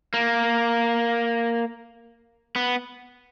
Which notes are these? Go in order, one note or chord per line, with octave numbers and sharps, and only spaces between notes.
A#3
B3